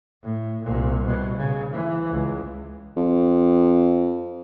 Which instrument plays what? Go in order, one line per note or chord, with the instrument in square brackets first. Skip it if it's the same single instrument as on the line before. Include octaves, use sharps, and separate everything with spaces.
[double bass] A2
C2 A#2
B2
C#3
E3
C#2
[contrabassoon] F2